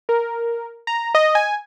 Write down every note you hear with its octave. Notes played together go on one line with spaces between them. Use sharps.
A#4
A#5
D#5
G#5